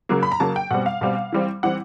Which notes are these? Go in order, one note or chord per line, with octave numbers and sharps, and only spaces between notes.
C#3 F#3 A#3
B5
A#5
C#3 F#3 A#3 A5
G5
B2 G3 C4 F#5
F5
B2 G3 C4
E3 G3 C4
E3 G3 C4 F#5